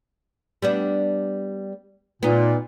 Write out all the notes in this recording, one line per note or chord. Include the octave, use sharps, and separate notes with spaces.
G3 B3 D4
A#2 B3 D#4